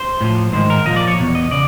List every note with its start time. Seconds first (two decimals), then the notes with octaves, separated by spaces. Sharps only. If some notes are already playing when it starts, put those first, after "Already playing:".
Already playing: C5
0.21 A2 F3
0.53 G#2 D#3 C5
0.70 A#4
0.85 A#2 F3 D#5
0.96 D5
1.08 C#5
1.19 E2 B2
1.35 D#5
1.51 C#3 D5